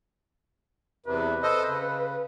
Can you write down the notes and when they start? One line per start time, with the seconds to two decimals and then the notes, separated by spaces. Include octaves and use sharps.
1.06 E2 C3 B4
1.43 A4 C5 D#5
1.67 C#3